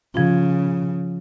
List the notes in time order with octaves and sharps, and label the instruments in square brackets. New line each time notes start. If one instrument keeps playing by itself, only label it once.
[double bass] C#3 [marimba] F3 F4